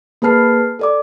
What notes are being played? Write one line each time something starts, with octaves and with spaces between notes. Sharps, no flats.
A#3 G#4 B4 A5 F6 C7
A4 D5 D6